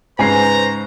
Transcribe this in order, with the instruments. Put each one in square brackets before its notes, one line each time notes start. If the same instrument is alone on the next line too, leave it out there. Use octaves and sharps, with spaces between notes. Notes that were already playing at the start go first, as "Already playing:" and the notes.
[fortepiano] G#2 C#3 [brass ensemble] B4 C5 [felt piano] G#5 C7 [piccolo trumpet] A#5